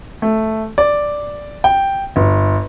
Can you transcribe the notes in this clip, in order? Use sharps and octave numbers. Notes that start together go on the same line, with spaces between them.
A3
D5
G5
G1